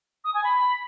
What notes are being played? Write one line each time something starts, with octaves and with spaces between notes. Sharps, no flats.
D#6
G#5
B5